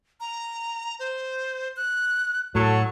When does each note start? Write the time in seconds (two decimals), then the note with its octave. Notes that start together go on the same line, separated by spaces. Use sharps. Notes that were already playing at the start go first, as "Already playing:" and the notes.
0.20 A#5
0.99 C5
1.77 F#6
2.55 A2 F#3 A4 C#6